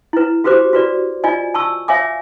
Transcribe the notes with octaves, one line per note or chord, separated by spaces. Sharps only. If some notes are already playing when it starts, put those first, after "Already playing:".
E4 B4
F#4 G4 B4 C5 D6
F#4 B4 D5
F4 D5 D#5 G#5
A5 C#6 E6
C#5 E5 F5 G#5 D6